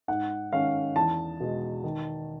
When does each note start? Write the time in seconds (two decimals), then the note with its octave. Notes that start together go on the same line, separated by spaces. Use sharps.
0.08 G#2 F#5
0.52 D#3 G#3 C#4 F5
0.96 E2 A5
1.40 B2 G#3
1.84 D#3